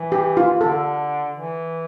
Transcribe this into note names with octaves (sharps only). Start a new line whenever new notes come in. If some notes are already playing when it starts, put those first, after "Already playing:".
Already playing: E3
G4
F4
D3 A4
E3